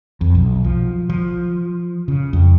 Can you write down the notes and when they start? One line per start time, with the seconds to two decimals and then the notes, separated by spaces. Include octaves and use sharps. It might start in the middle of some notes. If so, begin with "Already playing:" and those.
0.21 F2
0.35 B1
0.64 F3
1.10 F3
2.08 C#3
2.33 F2